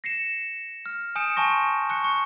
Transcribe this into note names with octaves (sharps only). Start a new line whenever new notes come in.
A#6 C7 C#7 E7
F6
G#5 D#6 G6 C#7 D7 E7
G#5 A5 C6 C#6 A#6
C#6 F#6 C#7
C#6